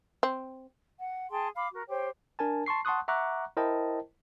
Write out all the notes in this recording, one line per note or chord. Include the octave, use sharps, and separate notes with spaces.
C4
F#5
G#4 G5 A5 C6
F5 B5 D6
F#4 A#4
G4 C5 C#5 G5
D4 A#4 G#5 A5
A5 C6 C#6 C7
F#5 A5 C6 C#6 D#6 F#6
E5 F#5 A#5 C#6 D6 F#6
E4 A#4 C5 D#5 G5 A5